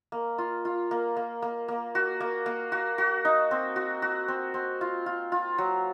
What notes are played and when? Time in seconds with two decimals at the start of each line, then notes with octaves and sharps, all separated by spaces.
0.12 A#3
0.38 F4
0.65 F4
0.91 A#3
1.17 A#3
1.42 A#3
1.68 A#3
1.95 F#4
2.20 A#3
2.46 A#3
2.72 F#4
2.98 F#4
3.25 D#4
3.51 C4
3.76 F#4
4.02 F#4
4.28 C4
4.54 C4
4.81 F4
5.06 F4
5.32 F4
5.58 F#3